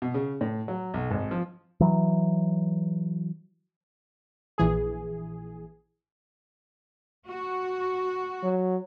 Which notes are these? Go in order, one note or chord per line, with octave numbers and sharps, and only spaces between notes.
B2
C#3
A2
F#3
B1
G#1
F3
E3 F#3
A#1 E3 G#4
F#4
F#3